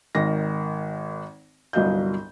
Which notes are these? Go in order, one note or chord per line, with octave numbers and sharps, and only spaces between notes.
G#1 D#3 A#6
G1 C2 F#3 D#5 F5 G6